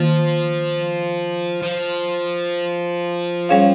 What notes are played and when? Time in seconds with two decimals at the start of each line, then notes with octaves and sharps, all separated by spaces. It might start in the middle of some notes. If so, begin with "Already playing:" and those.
Already playing: D#3 F3 A#3 F4
1.62 F3
3.49 G3 C#4 G#4 C#5 F5